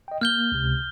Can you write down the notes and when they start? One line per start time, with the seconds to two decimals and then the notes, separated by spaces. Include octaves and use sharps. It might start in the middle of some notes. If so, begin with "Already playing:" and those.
0.08 D#5 G5
0.21 A#3 F6 G6 G7
0.52 C#2 C3